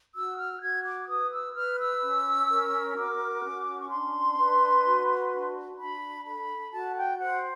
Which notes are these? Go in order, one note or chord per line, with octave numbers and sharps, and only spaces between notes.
F#4 E6
F6
F#4 G#6
D6
B4 D#6
E6
B4 F6
E6
C#4
A#4
F#4 D6
C#4
C#6
D4 C6
B4
F#4
D4
D4 B5
A4 B5
F#4 A5
G5
C5 F#5